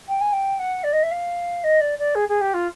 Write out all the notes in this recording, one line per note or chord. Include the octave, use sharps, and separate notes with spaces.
G5
G#5
G5
F#5
D5
D#5
E5
F5
D#5
D5
D5
G#4
G#4
G4
F4